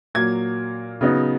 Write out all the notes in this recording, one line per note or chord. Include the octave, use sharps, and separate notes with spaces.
A#2 F#3 A#3 G#6
C#3 F#3 B3 D#4